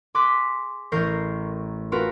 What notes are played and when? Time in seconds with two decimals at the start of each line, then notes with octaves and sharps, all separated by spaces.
0.15 G#4 C6 D6 F#6 B6
0.92 A1 A#4 C#6 G6 A#6 C7
1.92 C4 C#4 F4 F#4 A#4 B4